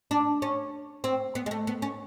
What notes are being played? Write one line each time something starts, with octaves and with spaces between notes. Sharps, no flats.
D4
C#4
C4
B3
G#3
A3
B3
C#4